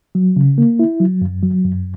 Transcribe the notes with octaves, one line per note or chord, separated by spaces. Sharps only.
F#3
C#3
A#3
E4
F#3
F#2
F#3
F#2